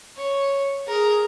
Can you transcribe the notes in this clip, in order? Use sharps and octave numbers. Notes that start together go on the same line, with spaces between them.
C#5
G#4 A#4